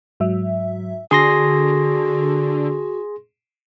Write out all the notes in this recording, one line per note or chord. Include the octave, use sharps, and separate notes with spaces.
G#2 F#3 E5
D3 F#4 G#4 C6 A#6